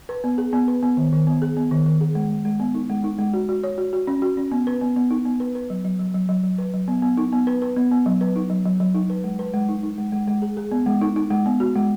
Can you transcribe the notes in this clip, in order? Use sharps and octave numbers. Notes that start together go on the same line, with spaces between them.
B4
B3
G#4
B3
B4
B3
D#3
D#3
B3
G#4
B3
D#3
D#3
G#4
G#3
G#3
G#3
B3
D#4
G#3
D#4
G#3
F#4
F#4
C#5
F#4
F#4
C#4
F#4
C#4
B3
B4
B3
B3
D#4
B3
B4
B4
F#3
F#3
F#3
F#3
F#3
F#3
B4
F#3
B3
B3
D#4
B3
B4
B4
B3
B3
F#3
B4
D#4
F#3
F#3
F#3
D#4
B4
G#3
B4
G#3
D#4
D#4
G#3
G#3
G#3
G#4
G#4
B3
G#3
D#4
D#4
G#3
B3
F#4
G#3